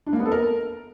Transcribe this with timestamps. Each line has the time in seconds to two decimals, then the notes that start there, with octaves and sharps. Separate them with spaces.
0.06 D4
0.13 A#3
0.19 B3
0.25 A4
0.32 A#4